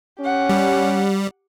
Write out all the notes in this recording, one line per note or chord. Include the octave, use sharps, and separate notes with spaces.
C#4 G4 F#5
G3